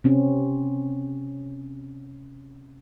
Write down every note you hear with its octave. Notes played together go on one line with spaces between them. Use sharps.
C3 C4 C#4